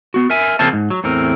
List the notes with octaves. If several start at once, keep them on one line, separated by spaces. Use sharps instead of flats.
B3 F#4
A#4 E5 G#5
C#3 F3 A#3 C4 A5
G#2
F#3
E2 A2 C4 A#4